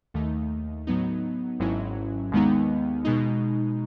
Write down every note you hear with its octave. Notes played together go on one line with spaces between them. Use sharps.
D#2 D#3 A3 D#4
A2 F#3 B3 D#4
G#1 G#2 F#3 C#4 E4
D#2 D#3 G#3 B3 D#4
B2 G#3 D#4